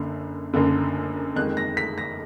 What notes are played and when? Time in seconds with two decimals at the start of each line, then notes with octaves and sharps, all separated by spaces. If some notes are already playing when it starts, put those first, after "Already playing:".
Already playing: F#1 F#2 D3
0.54 F#1 F#2 D3
1.36 F2 D#3 G#3 F#6
1.57 A#6
1.77 B6
1.98 A#6